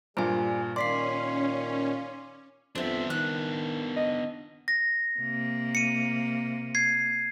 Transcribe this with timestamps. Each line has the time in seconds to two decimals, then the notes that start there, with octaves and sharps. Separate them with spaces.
0.17 G2 A#2 G3 G#4 C5 G#5
0.76 A#2 D#3 A#3 C#4 D5 C6 B6 C7
2.75 F2 B3 C4 D4 E5
3.10 D#3 F#6
3.96 D#5
4.68 A#6
5.19 C3 A#3
5.75 C#7 D#7
6.75 G#6 C7